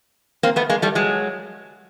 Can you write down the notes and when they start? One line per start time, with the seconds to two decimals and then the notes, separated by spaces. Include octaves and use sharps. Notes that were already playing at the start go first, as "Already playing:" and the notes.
0.43 A#3 C4
0.56 A3 B3
0.70 G#3 A#3
0.82 G3 A3
0.95 F#3 G#3